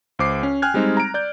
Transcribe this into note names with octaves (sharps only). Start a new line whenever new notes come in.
C#2 C5 D6 C7
C#4
G5 G#5 F6 F#6 G#6
G3 G#3 C4 D#4
A#5 D7
D5 G6